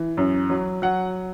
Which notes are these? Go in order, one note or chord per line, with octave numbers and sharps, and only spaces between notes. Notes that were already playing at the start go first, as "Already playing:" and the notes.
Already playing: E3
F#2
F#3
F#3 F#5